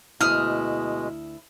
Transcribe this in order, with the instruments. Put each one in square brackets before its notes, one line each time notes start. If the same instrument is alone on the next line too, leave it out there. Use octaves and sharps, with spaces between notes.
[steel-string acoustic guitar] D2 E4 [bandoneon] B2 G#3 [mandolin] D#6 F6